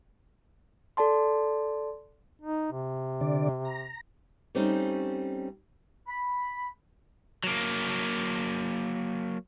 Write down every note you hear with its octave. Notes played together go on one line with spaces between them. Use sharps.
A4 D5 A5 C6
D#4
C3
D3 D5
A#5
G3 A3 C4 C#4 D#4
B5
F#3 A#3